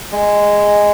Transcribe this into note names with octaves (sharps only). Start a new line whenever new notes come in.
G#3